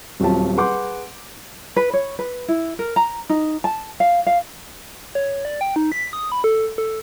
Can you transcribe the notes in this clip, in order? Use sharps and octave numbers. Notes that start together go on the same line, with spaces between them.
D#1 F#3 C4 F4 G4 A5
G#4 B4 F#5 C6 D6 G6
B4
C#5
B4
E4
A#4
A#5
D#4
A5
F5
F5
C#5
D5
G5
D#4
B6
D#6
B5
A4
A4